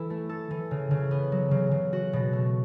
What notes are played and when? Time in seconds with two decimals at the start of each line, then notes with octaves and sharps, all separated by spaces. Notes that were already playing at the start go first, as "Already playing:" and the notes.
Already playing: E3 E4 A4
0.10 A3
0.29 A4
0.51 E3
0.71 C#3
0.91 C#3
1.11 B3
1.32 F#3
1.51 C#3
1.72 C#3
1.93 F#4
2.13 B2
2.33 A3